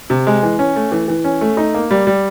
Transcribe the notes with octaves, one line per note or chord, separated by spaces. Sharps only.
C3
G#3
E3
C#4
A3
E3
E3
C#4
A3
D#4
A#3
G3
G3